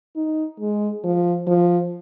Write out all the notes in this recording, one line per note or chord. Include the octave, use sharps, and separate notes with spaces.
D#4
G#3
F3
F3